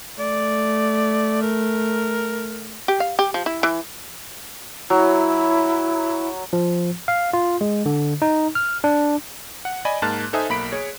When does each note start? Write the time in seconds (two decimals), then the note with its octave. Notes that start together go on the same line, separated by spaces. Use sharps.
0.19 A3 D5
1.42 A#4
2.88 G4
3.00 F5
3.19 G4
3.34 F3
3.46 E4
3.63 E3
4.90 F#3 E4
6.53 F3
7.08 F5
7.33 F4
7.61 G#3
7.86 D3
8.22 D#4
8.55 F6
8.84 D4
9.65 F#5
9.85 D5 D#5 G#5 B5
10.02 G#2 A#3 A5 F6 F#6 A6
10.33 D#4 A4 C5 E5 G#5 D#6
10.49 B1 A#3 B5 B6 D7
10.72 G#4 C#5